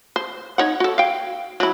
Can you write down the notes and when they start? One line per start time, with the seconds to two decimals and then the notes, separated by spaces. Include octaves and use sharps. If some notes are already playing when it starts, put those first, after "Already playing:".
0.16 C5
0.58 D#4 C#5 F#5
0.80 F#4 A4
0.98 F5 G5
1.60 F#3 E4